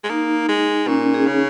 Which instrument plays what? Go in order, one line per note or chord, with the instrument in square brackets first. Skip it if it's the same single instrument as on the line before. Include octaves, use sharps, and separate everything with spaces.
[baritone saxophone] G#3
[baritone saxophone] A#3 [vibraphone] D#4
[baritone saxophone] G#3
[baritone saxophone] A#2 [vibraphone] C#4
[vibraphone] G#4
[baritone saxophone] C#3